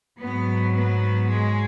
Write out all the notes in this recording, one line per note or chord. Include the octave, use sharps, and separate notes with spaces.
G#2 F#3 B3
B3
G#3